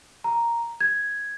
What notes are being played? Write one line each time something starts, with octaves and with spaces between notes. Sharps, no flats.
A#5
G#6